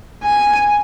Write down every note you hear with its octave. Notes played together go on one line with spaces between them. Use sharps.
G#5